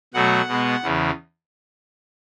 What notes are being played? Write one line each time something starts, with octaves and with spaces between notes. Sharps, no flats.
B2 F#3 A3 F#5
B2 G#3 B3
E2 C#3 E3